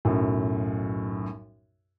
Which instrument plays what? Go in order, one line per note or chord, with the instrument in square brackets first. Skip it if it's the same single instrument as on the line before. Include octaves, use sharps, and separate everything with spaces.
[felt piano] B1 F#2 A2